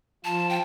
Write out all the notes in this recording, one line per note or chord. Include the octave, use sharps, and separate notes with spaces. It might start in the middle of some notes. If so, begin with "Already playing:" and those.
F3 F4 A5
G5